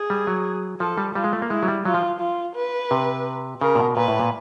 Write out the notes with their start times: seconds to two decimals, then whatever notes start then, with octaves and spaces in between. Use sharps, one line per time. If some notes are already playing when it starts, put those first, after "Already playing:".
Already playing: G#4
0.10 G3
0.27 F#3
0.80 F3 A4
0.98 G3
1.15 G3 F4
1.24 G#3
1.33 A3
1.42 A#3
1.50 G#3 E4
1.63 F#3
1.68 G3
1.85 F#3 F4
1.94 F3
2.21 F4
2.56 B4
2.91 C3
3.61 C#3 A#4
3.75 A#2
3.79 B2
3.97 A#2 B4
4.08 A2
4.20 A#2